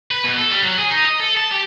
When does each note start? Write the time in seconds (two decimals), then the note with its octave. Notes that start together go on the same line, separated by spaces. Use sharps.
0.11 B4
0.24 B2
0.36 A4
0.50 G3
0.63 F#3
0.78 G#4
0.91 D#4
1.05 D#5
1.20 A4
1.37 A5
1.51 G4